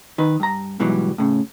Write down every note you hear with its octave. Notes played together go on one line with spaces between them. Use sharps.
D#3 B4
G2 A#5
G#2 B2 E3 F#3 G3
A2 C#3